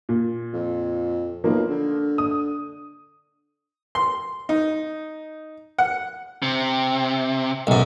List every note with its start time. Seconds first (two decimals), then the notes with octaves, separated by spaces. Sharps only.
0.09 A#2
0.53 F2
1.44 B1 F3 A#3
1.69 D3
2.18 D#6
3.95 C6
4.49 D#4
5.78 F#5
6.43 C3
7.67 B1 F#2